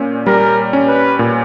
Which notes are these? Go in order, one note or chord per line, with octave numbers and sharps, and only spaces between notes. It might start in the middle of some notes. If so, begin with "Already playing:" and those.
Already playing: A#2 C#4
G3 A#4
C#4
B4
A#2